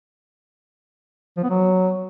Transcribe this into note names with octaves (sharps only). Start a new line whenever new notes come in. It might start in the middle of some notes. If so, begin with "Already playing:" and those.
F3
B3
F#3